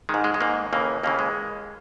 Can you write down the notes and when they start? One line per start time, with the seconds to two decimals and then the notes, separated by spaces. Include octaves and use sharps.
0.09 D#3 G#3
0.14 G#2
0.24 G#3
0.34 G#3
0.41 G#2 D#3 A#3
0.73 D#2 C#3 E3 A#3
1.03 D#2 C#3 E3 A#3
1.19 G#3